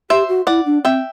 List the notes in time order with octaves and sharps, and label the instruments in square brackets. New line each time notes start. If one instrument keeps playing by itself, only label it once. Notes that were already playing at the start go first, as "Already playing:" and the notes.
[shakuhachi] G4 [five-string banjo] C5 E5
[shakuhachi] F#4
[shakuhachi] E4 [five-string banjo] D5 F#5
[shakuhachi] D4
[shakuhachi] C4 [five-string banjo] E5 G5